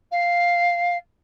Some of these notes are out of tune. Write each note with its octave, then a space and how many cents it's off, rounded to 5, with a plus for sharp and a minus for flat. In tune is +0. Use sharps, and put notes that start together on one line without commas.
F5 +0